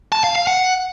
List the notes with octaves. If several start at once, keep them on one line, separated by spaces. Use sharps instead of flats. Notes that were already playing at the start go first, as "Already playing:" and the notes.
A5
F5
F5
F#5